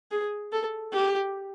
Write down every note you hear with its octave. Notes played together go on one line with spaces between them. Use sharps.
G#4
A4
G4